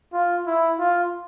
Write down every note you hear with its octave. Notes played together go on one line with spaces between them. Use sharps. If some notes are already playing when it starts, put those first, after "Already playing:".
F4
E4
F4